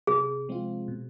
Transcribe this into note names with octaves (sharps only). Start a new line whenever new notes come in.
C3 G#4
F3 G#3 C4 F4
B2